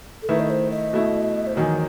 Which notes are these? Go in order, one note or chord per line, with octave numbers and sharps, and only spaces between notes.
A4
D#3 A3 E4 B4
D#5
C5
D#5
B2 A3 E4
C5
E2 D#3 F#3 D#5